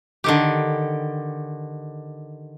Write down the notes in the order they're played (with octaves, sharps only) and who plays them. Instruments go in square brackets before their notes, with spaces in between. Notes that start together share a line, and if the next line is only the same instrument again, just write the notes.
[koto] D3 D#3 G4